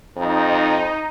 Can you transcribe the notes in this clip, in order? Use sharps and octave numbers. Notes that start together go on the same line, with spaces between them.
F2 D#4